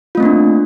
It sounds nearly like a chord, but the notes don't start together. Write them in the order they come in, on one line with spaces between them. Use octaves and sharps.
F4 A3 C4 A#3 D4